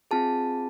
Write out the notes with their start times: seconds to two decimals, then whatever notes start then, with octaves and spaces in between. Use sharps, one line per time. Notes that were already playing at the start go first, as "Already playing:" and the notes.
0.11 C4 F4 G#4 A5